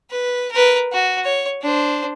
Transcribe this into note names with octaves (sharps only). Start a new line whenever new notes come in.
B4
A#4 B4
F#4
C#5
D4 C5